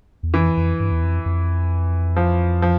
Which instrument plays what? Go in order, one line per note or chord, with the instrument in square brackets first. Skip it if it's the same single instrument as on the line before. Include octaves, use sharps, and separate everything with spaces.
[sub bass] E2
[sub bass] F2 [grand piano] E3
[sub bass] F2
G2
E2
F2
F2
[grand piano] F3
F3